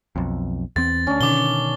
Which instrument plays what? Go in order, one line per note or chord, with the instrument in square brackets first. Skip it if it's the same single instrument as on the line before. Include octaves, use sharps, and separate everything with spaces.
[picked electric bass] B1 F2
[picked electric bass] E2 C4 [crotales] A6
[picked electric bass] D2 [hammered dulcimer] C#4 D4
[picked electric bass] B2 D3 D#3 [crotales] D6 G7